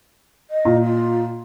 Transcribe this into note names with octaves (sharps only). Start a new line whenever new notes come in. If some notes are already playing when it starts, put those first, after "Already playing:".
D#5
A#2
F4